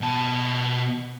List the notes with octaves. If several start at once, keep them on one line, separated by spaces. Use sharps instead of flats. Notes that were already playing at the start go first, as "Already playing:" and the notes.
B2 A5